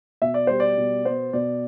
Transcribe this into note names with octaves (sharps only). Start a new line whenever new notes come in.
B2 E5
D5
G3 C5
D5
B2
B3 C5
B2 D5